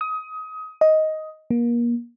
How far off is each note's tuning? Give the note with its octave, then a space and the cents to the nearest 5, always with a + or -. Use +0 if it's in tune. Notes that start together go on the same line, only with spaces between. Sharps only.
D#6 +25
D#5 +10
A#3 +30